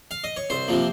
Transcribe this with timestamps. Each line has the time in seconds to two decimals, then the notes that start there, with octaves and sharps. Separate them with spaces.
0.11 F5
0.24 D#5
0.37 C#5
0.50 C2 C5
0.68 C3 F3 A#3